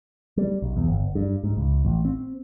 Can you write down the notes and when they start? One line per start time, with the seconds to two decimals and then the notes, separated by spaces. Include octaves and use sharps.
0.37 G3
0.62 B1
0.77 E2
0.88 G1
1.15 G2
1.44 G#2
1.57 C#2
1.85 A1
2.05 C4